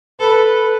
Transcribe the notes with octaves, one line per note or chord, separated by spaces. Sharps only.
A4 B4